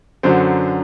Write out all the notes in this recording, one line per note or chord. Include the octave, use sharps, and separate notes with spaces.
F#2 D3 F#3 C5